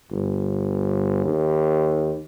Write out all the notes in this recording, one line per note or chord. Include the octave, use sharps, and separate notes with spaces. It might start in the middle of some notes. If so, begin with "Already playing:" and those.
G1
D#2